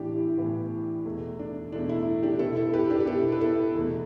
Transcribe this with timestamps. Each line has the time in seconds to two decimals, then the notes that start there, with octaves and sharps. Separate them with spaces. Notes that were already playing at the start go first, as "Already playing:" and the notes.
Already playing: A2 E3 B3 D4 G4
0.16 E4
0.37 A2 E3 B3
1.05 E2 B2 A3
1.39 D4
1.72 E2 B2 A3 D4
1.89 E4
2.23 D4 G4
2.39 B2 B3 E4 A4
2.56 E4 A4
2.74 G4 B4
2.90 D4 G4
3.00 G4
3.07 B2 B3 E4 A4
3.32 B4
3.40 E4 A4
3.74 E2 B2 A3